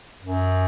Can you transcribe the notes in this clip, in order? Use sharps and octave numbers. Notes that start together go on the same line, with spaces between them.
F#2